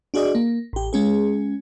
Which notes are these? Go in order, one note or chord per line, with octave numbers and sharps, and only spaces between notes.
D4 F#4 G#4 D5 D#5
A#3
A1 G4
G#3 C#4 G#4